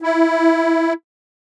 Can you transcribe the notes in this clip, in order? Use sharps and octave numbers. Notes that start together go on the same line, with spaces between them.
E4